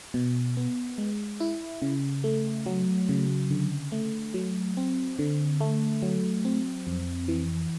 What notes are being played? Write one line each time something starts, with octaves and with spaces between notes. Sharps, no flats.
B2
B3
G#3
E4
C#3
A3
F#3
C#3
D3
A3
F#3
C4
D3
A3
F#3
C4
F2
E3